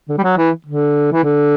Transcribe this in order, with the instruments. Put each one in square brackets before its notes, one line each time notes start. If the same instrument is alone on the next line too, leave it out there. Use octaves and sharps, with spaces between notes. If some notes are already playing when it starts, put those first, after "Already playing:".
[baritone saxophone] D3
G3
F#3
E3
D3
E3
D3